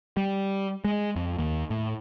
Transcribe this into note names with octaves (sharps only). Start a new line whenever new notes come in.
G3
G#3
F2
D#2
A2